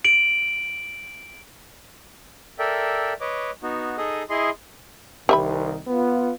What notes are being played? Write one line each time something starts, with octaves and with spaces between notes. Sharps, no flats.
D7 F#7
A4 A#4 D5 E5 G5
B4 C#5 D#5 D6
B3 D#4 F#4
D#4 G#4 A4 D#5 D#6
E4 G#4 D#5 C6
C2 D#3 G4 E5 B5
B3 F4